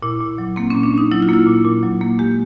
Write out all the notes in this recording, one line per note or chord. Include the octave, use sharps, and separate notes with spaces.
A#2 E4
A#2
F#3
A#3 C4
A#2 C#4
D4
A#2 D#4
F#3 E4
F4
A#3 E4
A#2
A#2
F#3
A#3
G#3 G4